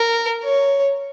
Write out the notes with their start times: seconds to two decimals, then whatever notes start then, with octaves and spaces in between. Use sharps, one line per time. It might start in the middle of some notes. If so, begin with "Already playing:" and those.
Already playing: A#4
0.44 C#5